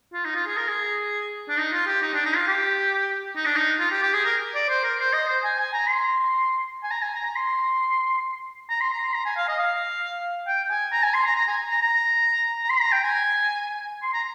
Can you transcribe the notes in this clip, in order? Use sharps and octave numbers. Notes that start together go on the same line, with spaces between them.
F4
D#4
F4
G#4
A#4
G#4
D4
D#4
F4
G4
D#4
D4
D#4
F4
G4
D#4
D4
D#4
F4
G4
G4
G#4
A#4
D5
C5
A#4
C5
D#5
C5
G#5
G#5
A#5
C6
G#5
A#5
G#5
A#5
A#5
C6
A#5
C6
A#5
C6
A#5
G#5
F5
D#5
F5
G5
G#5
A#5
G#5
C6
A#5
A#5
G#5
A#5
A#5
A#5
C6
A#5
G5
G#5
C6
A#5